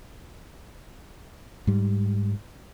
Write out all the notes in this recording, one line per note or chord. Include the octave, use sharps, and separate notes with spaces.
G#2 G3